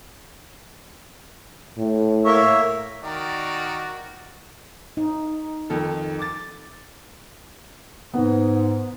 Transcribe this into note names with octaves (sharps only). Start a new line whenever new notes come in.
A2
A#3 C#5 E5
D#3 F#4 A#4 D5
D#4
F2 D#3 A4
D6 A6
G#2 B3